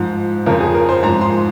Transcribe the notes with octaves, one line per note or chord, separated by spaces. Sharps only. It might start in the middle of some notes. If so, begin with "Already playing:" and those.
Already playing: G#2 F3
F2 C#3 F3 A#4
G#4
A#4
C5
G#2 A#5
F3
C6